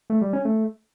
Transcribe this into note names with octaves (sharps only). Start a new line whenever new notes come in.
A3
G3
C#4
A3